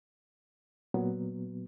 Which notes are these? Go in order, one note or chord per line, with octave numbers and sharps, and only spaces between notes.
A#2 F#3 B3